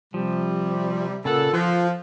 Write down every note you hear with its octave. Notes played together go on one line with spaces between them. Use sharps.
C3 F3 G3
A#2 C#3 A4 F#5
F3 F4 F#6